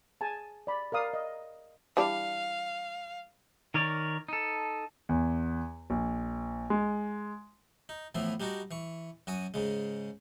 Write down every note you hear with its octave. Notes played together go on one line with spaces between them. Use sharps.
G#4 G#5 A5
D5 B5
A#4 D5 F5 D#6
D#5
E3 G3 D4 F5
D#3 A#4 C#5 D5
D#4 A4
E2
A#1
G#3
D#4
A2 E3 F3 B3 E4
G3 D4 D#4 F#4
E3 C#6
F#2 F#4 G#5 D#6
G#2 C#3 G#3